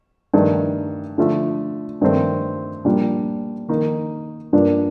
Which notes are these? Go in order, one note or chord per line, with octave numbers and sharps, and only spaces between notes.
G2 D#3 A3 D#4
D3 F3 A3
G2 D#3 A3 C4
A#2 G3 D4
D#3 A#3 D#4
G2 F3 A#3 D4